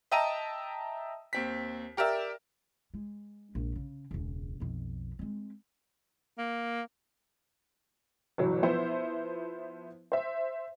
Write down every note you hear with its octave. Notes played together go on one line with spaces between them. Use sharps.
D#5 E5 G5 A5 A#5 D#7
D#2 C4 B6
G4 A#4 D5 E5
G#3
A#1 G#3
C#3
E1 C#2
B1 F2
G#3 C4
A#3
G1 B2 E3 F#3
F3 B3 E4 C5 E5
C5 E5